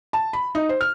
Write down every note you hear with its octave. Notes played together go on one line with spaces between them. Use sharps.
A5
B5
D#4
C5
F6